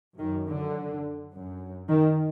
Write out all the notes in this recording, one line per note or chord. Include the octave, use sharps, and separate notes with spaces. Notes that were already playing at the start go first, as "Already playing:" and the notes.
F#2 D#3
D3
F#2
D#3